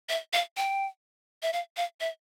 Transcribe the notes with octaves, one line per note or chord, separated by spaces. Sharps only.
E5
F5
G5
E5
F5
F5
E5